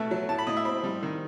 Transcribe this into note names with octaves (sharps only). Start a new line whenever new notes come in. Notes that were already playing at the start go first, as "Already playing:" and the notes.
Already playing: B2 A3 E4
F#3
A2 A5
B5
A2 D#5
E5
C4 B5
G3
D#3